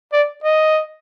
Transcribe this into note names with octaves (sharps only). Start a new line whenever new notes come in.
D5
D#5